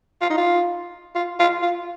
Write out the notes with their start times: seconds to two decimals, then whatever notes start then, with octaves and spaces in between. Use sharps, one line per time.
0.21 F4
0.30 D#4
0.37 F4
1.15 F4
1.40 F4
1.62 F4